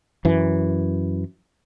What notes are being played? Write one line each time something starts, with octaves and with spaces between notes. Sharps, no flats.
F#2 E3